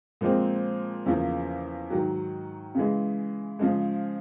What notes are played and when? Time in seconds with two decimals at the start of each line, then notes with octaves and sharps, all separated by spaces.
0.21 A#2 F3 G#3 C4
1.06 E2 C#3 F3 A#3
1.90 G#2 D#3 F#3
2.75 C#3 E3 G#3
3.59 C#3 F3 G#3